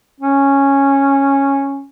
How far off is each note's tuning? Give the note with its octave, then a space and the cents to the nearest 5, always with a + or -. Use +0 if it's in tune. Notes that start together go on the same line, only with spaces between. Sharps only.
C#4 -5